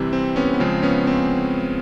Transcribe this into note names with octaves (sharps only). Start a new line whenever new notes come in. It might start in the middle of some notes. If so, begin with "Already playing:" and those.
Already playing: C3 E3 G3 C4
C4
B3 C#4
B3
C#3 F3 G#3 C4
B3 C#4
C4